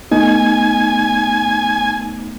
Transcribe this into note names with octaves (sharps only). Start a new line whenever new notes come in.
A3 B3 D#4 G#5